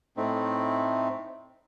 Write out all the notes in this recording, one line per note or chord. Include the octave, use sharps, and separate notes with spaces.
A2 A3 C4 D#4